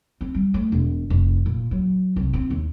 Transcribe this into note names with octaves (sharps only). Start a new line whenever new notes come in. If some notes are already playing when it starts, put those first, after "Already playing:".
C4
G3
A3
E1
F1
A#2
F#3
C2
C4
D#2